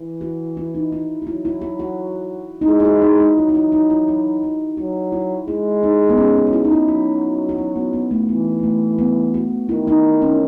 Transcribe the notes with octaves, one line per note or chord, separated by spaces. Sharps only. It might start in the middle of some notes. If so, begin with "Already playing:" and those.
Already playing: E3
F#4
E4
D#4
E4
F#4
F#3 E4
E4
F#4
F#4
D#4
G#3 E4
E4
F#4
D#4
D#4
F#3 E4
D#4
E4
D#4
E4
F#4
E4
F#3 F#4
E4
G#3 E4
D#4
B3
C#4
C#4
F#4
E4
D#4
E4
F#3 F#4
F#4
E4
B3
B3
A3
A3
E3 B3
B3
A3
B3
F#4
D#3 E4
D#4
C#4